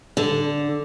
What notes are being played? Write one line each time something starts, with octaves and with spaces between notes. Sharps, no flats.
D3